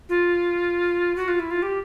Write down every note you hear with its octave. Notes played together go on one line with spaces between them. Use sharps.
F4
F#4
F4
E4
F4
G4